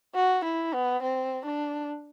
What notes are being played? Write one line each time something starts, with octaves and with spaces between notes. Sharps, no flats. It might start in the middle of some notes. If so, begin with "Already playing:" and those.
F#4
E4
B3
C4
D4